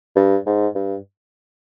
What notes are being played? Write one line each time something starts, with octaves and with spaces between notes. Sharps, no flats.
G2
G#2
G2